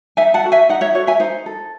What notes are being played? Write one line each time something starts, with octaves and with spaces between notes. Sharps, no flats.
D#4 E5 G#5
F#5 A5
F#4 A4
E5 G#5
D#4 D#5 F#5
C#5 E5
F#4 A4 C#5
E5 G#5
D#4 C5
A4